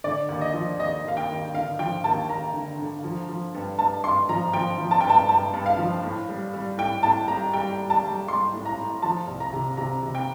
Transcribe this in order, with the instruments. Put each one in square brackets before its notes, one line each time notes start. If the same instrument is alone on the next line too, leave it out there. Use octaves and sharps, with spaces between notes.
[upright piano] D3 D5
D#2
D#5
F3
D#2 D#5
D#2 F5
G5
D#2
D3 F5
F3 G5
D#2 A5
D#2 A#5
D3
D3
F3
F3
G2
G2 A5
G2 C6
F3 A#5
F3 G5
F3
A5
G2 G5
A5
G2 A5
G2
F5
F3
A2
G3
G3
A2 G5
A2 A5
G3 A#5
G3 G5
G3
A5
G3
G3 C6
A2
A#5
A2
F3 A5
C2
A#5
C3
C3 A#5
C3
G5